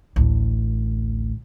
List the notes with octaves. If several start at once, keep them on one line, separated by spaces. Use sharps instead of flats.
A1 D2